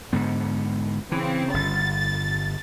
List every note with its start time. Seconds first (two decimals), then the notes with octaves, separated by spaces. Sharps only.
0.13 G#2 D3 B3
1.12 C#3 E3 C4
1.54 G1 A6